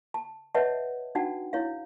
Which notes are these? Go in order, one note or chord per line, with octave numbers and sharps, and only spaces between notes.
A5
B4 C#5 D#5 E5 F#5 A5
D4 D#4 F#4 F#5 G5 A5
E4 C#5 F5